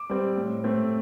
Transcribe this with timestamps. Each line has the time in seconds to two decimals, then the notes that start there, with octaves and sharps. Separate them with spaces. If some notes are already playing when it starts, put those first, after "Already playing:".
Already playing: D6
0.10 G3 C4
0.37 A2
0.64 A3 C4